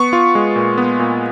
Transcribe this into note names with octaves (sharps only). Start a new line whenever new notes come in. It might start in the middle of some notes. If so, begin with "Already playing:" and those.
Already playing: B3 C#6
F4
G#3
A#2
B3
A#2